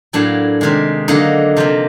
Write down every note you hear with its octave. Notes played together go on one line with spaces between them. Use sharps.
A2 F#3 A#3 D4
C3 D#3 G#3
D3 F#3 A#3 D#4
C3 F3 A#3